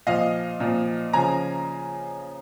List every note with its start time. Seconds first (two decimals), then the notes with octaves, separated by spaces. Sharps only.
0.07 A#2 F3 D#5 F5
0.60 A#2 F3
1.13 C#3 F3 G#5 A#5